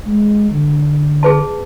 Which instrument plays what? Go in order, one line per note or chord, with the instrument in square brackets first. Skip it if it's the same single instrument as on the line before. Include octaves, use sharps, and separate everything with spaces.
[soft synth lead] G#3
D3
[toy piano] G#4 B4 A5